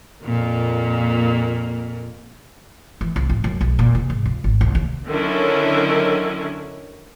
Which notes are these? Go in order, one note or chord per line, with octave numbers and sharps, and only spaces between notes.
F2 A#2 A#3
E3
C2
A1
F#2
B1
A#2
C3
G#2
C#2
G#1
C2
D#2
D3 D#3 F#3 C#4 E4